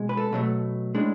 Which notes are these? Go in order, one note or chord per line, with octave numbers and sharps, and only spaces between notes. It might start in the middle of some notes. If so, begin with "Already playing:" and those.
Already playing: B2 G#3
B4
A4
B2 F#3 A3
A2 G#3 D4